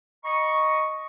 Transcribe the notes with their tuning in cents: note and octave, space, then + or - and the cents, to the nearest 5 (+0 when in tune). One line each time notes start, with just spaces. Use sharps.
D#5 +0 A#5 +45 C#6 +0